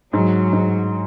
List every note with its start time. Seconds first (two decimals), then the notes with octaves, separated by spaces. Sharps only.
0.13 G#2 F#3
0.53 G#2